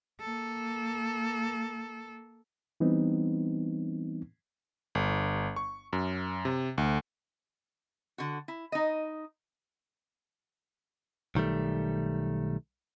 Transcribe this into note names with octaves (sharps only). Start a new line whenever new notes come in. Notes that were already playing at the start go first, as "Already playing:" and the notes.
A#3 A4
E3 G3 B3 C4 D#4
G1
C#6
F#2
C3
D2
D3 F#4
E4
D#4 D#5
B1 D#3 G3 A3